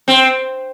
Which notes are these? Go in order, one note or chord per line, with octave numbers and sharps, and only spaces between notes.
C4